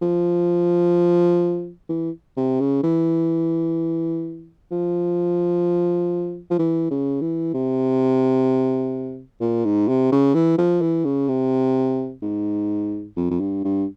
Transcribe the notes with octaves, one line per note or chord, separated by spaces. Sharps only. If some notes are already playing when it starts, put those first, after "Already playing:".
F3
E3
C3
C#3
E3
F3
F3
E3
C#3
E3
C3
A#2
G#2
C3
C#3
E3
F3
E3
C#3
C3
G#2
F2
F2
G2
G2